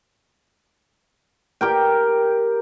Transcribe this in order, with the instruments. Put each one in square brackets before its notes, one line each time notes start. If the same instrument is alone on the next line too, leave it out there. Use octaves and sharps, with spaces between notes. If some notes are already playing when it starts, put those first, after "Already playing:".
[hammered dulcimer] G4 A#4 G5